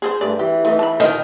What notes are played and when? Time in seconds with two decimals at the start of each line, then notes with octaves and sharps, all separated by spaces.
0.02 G#4 A4 C5
0.21 G2 A3 D5
0.39 E3 G4
0.65 E3 A3 D#4
0.79 A5 B5
1.00 D#3